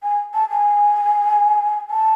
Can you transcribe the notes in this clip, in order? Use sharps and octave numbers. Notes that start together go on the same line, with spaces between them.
G#5
A5
G#5
A5